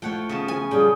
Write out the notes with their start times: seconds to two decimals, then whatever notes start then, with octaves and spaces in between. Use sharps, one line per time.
0.02 F3 A3 C#5 F#5 G5
0.29 C#3 B3 A5
0.48 G#5
0.71 F3 G3 C#4 G#4 G5